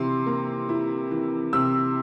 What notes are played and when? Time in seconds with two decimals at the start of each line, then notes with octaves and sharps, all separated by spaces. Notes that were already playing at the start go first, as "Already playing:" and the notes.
Already playing: C3 E3 E4 C6
0.26 A#3
0.69 E4
1.11 E3
1.53 C3 E6